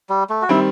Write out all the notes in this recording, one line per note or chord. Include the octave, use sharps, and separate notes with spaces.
G3
A3
F#4
D#3 G3 C4 E4